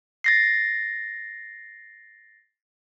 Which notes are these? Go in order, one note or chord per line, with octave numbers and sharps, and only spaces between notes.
A6 A#6 C7